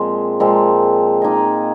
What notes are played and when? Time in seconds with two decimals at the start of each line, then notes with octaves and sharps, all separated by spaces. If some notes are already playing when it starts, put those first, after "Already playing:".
Already playing: A#2 F3 G#3 C4
0.40 A#2 F3 G#3 C4
1.22 A#3 D#4 G#4 D#5